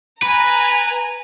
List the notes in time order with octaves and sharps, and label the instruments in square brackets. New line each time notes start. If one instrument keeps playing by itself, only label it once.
[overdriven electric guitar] B4 [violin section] G#5 A#5